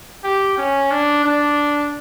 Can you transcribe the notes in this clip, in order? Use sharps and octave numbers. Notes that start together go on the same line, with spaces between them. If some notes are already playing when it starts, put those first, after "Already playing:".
G4
C#4
D4
D4